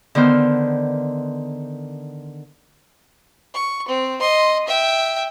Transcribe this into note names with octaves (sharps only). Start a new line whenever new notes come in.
D3 D#3 B3 C5 F6
C#6
C4
D#5 C6
E5 G5